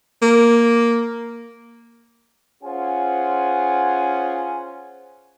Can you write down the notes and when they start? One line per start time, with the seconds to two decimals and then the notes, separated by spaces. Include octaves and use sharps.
0.22 A#3
2.63 C#4 F4 G#4 C5 F#5 G#5